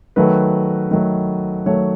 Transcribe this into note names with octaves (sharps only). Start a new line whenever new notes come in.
D#3 F#3 A3 B4
D#3 F#3 A3
D#3 F#3 A3 C#5